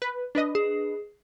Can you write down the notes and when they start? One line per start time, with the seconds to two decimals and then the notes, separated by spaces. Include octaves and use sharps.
0.02 B4
0.35 D4 B4 D#5
0.55 G#4